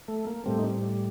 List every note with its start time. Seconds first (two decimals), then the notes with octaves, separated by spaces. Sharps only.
0.08 A3
0.27 A#3
0.46 A2 G3 A3 C4
0.59 D#4